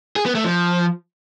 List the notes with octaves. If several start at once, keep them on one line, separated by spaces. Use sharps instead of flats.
G#4
B3
A3
F3